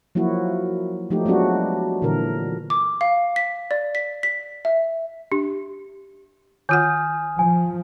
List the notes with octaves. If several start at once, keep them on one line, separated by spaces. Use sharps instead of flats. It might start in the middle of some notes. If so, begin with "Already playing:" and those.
F3 F#3 A#3 E4 F#4
F3 A3 D#4 G4
F#3 G#3 B3 D4 F#4
A#2 D3 E3 A#4
D6
F5
B6
D5
B6
B6
E5
D4 G4
D#3 F4 F#5 G#5 D#6 F6 G6
F3 G#5